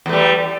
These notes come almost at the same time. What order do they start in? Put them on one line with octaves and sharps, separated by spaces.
E2 A3 G3